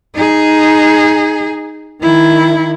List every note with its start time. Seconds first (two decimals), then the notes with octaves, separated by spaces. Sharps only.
0.15 D#4 G#4
2.02 D#3 E4